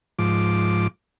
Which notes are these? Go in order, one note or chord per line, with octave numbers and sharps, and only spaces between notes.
G#2 F3 D6